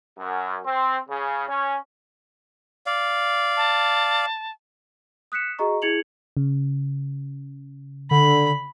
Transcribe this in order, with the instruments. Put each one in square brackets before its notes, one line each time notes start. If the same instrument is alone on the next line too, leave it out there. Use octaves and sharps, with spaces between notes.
[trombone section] F#2
C4
C#3
C#4
[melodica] D5 F5
[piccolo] A5
[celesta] D#6 F#6 B6 C#7 E7
F#4 G#4 D#5 A#5 C#6
E4 G#4 G#6 C#7 F7 F#7
[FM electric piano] C#3
[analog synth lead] D3 [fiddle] B5